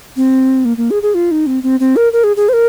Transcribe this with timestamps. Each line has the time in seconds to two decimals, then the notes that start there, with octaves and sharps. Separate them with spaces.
0.17 C4
0.65 A#3
0.77 A#3
0.91 G#4
1.03 G#4
1.15 F4
1.31 D#4
1.47 C4
1.63 C4
1.80 C4
1.96 A#4
2.13 A#4
2.24 G#4
2.36 G#4
2.49 C5
2.53 A#4